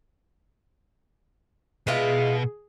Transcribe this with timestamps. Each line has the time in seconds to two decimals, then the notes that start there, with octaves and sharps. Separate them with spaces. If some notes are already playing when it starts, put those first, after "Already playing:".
1.87 B2 G#3 E4 F4 G#4 B4